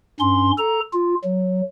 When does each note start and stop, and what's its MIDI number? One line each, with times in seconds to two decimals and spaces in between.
0.20 0.51 43
0.20 0.51 61
0.20 0.51 84
0.58 0.80 69
0.58 0.80 82
0.93 1.15 65
1.24 1.61 54